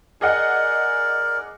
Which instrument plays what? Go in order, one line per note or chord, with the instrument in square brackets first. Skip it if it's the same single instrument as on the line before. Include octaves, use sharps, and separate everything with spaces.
[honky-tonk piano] G#4 D#5 F#5 [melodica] A#4 D5